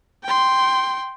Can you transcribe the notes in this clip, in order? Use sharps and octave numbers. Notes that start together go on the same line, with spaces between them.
G5 C6